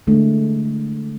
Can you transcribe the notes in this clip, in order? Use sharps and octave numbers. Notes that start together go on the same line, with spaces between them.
D3 G#3 A3 D4